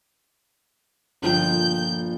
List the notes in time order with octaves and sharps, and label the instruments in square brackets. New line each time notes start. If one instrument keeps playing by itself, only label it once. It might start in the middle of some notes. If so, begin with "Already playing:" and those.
[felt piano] G1 F3 [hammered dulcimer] A#2 A4 G5 [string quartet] G6